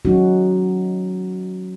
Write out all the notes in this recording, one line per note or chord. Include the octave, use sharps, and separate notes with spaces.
F#3 G#3 C#4 D#4 F#4